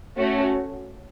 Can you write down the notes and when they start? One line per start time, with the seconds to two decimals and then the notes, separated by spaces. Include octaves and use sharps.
0.17 A3 C#4 F#4